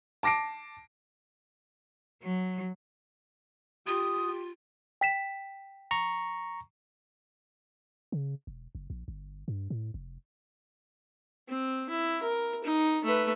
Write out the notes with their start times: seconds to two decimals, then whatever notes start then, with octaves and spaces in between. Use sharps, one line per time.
0.23 A5 D6 A#6 C7 D7
2.23 F#3
3.87 F4 G4 D#6
5.01 G5 B6 E7
5.91 A#5 C#6
8.12 C#3
8.47 E1
8.75 F#1
8.90 A#1
9.08 G1
9.48 G2
9.70 A2
9.94 F1
11.48 C4
11.90 E4
12.22 A#4
12.64 D#4
13.04 A3 B4